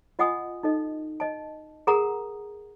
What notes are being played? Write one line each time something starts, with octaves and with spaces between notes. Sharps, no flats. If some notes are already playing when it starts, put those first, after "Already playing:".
F4 D#5 F#5 G#5 D#6
D#4 A4 D#5
D#5 A5
G#4 A#4 F#5 A#5 D#6